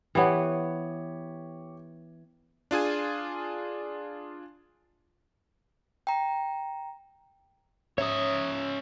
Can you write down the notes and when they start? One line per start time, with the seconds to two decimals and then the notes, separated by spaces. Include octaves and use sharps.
0.15 E3 B3 G4 C#5
2.71 D4 F4 G#4 G#5
6.07 G5 A#5
7.98 C#4 C#5 E5 D#6